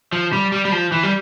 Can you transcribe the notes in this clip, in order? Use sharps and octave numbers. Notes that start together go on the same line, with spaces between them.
F3
G3
G3
G3
F3
E3
G3